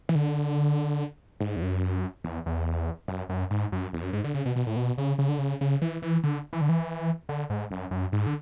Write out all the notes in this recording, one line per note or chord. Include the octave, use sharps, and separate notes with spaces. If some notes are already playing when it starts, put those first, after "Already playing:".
E3
D3
G#2
E2
F#2
E2
E2
F#2
F#2
G#2
F#2
E2
F#2
G#2
D3
C#3
B2
B2
A2
B2
C#3
C#3
D3
C#3
C#3
E3
E3
D3
E3
D3
E3
D3
G#2
F#2
F#2
G#2
D3